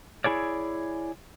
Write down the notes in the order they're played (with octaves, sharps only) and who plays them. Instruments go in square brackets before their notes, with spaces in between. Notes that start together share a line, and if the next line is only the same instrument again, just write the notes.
[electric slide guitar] E4 G#4 C#5 D5